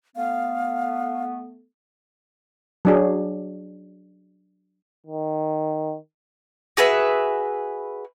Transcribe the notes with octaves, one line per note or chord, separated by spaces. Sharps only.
A3 B3 F5
F#3 D4 G#4
D#3
F#4 G#4 B4 E5